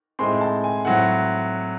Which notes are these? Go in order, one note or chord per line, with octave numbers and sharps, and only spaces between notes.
A2 G#3 C4 C6
A5
G#5
A2 F#3 C4 F#5